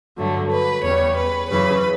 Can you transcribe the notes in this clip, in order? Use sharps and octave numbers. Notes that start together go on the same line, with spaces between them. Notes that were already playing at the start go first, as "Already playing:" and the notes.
G2 D3 F#3 A3
B4
E2 C#3 G3 C#5
B4
F#2 C#3 E3 B4